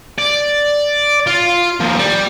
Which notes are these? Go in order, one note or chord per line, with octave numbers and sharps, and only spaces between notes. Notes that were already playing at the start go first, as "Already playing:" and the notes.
D5
F4
D#2 F3
G3